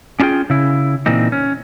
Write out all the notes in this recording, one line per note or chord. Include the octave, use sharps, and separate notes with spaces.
C#4 D4 F4 G#4 G5
C#3 E4
A#2 E3 C4 D#4
C#4